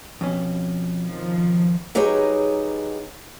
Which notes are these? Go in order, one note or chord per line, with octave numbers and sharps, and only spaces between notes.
F2 B2 C#4
D#3 F3
F#3 D#4 G4 G#4 B4 C#5